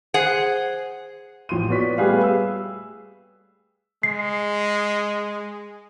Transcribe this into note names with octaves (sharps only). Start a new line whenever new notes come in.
G#4 C5 F#5
A1 F3 C6 D#7
A#2 B3 F#4 C#5 D5 B6
G3 A3 G4 G#4 B4 F5
E6
G#3 C7